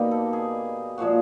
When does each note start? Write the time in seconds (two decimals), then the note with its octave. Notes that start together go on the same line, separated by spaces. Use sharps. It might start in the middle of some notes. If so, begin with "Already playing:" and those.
Already playing: B2 G3 A#3 D#4 B4
0.11 A4
0.33 G#4
0.98 A#2 F3 G#3 F#4